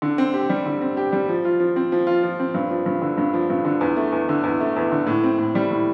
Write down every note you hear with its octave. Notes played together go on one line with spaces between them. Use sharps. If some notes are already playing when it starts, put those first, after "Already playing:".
D3
C4
G4
G3
D3
C4
G4
G3
F3
F4
F3
C4
F3
F4
F3
C4
G2
F3
G2
D3
G2
F3
G2
D3
E2
A3
E2
D3
E2
A3
E2
D3
A2
C4
A2
G3
A2